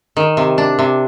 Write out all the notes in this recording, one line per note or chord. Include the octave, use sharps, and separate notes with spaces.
D#3
C3
D4
C3